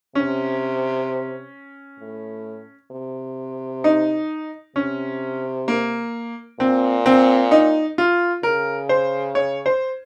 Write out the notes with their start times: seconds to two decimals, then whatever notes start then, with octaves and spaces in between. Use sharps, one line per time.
0.15 C3 C#4
2.00 A2
2.91 C3
3.84 D#4
4.76 C3 C#4
5.68 A#3
6.59 A#2 C4
7.06 C4
7.51 D#4
7.98 F4
8.43 C#3 A#4
8.89 C5
9.35 C#5
9.66 C5